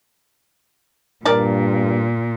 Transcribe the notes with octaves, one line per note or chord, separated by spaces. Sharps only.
G2 A#2 A#4 D5 A5